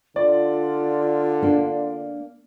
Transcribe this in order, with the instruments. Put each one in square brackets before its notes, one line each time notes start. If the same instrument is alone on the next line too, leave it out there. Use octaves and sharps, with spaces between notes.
[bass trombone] D3 [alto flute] F4 [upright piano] D5
[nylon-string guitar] A#3 D4